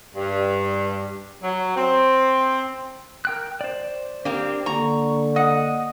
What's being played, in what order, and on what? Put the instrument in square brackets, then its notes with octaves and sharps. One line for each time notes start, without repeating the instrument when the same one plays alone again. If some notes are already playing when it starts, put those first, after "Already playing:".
[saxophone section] G2
F#3
C4
[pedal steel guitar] A#4 G5 F#6
C5 D5
[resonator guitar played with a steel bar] A#3 C4 [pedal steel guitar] D4 G4
[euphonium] D3 [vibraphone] A#3 [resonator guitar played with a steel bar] A#5 [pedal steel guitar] C#6
[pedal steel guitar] D#5 [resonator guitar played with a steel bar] F#5